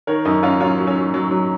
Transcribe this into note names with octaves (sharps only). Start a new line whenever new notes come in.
D#3 A#4 C#5
F#2 D#4
F#2 C#4 F4
F#3 C#4 F4
F#3
C#4
F#3
F#3
F#3